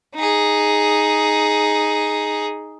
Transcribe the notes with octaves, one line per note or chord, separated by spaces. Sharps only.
D#4 G#4